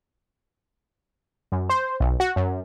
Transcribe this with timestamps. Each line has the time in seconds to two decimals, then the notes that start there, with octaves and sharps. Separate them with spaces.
1.52 F#2
1.70 C5
2.00 B1
2.20 F#4
2.36 F#2